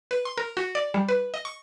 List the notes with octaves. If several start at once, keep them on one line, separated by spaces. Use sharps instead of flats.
B4
C6
A#4
F#4
D5
G3
B4
D#5
C#6